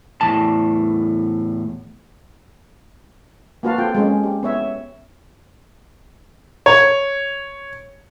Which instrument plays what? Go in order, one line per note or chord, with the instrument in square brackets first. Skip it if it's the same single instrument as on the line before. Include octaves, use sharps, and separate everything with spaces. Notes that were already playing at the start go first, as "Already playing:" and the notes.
[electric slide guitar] E2 A2 A5
[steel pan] A#3 F4 F#4 B4 F5 A5
C4 F4 A4 G5
G#3 C#4
G4
B3 C#5 E5
[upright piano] C#5